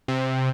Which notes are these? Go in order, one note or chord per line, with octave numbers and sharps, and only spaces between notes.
C3